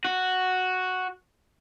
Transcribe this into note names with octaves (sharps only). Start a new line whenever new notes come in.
F#4